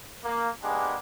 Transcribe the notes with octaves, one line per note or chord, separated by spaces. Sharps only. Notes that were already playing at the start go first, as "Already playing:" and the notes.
A#3
G#3 A#3 B3 D4 G4 G#4